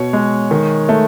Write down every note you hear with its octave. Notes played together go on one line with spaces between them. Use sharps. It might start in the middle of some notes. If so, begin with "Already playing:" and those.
Already playing: B2 C#5
G#3
D#3
A3